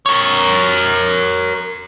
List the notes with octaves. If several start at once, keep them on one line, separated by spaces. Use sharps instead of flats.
A#4 C#5